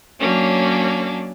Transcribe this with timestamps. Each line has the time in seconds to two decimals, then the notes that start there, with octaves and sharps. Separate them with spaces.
0.20 F#3 A#3 C#4 D4